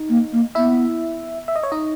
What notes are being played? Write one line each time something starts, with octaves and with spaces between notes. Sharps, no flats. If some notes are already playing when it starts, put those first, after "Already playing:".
Already playing: D#4
A#3
A#3
B3 E4 E5
E5
D#5
C#5
D#4 D#5